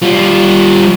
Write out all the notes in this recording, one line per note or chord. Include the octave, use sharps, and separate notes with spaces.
G3 F4